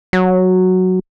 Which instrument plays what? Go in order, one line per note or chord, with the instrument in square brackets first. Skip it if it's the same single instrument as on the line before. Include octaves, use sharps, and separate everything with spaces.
[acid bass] F#3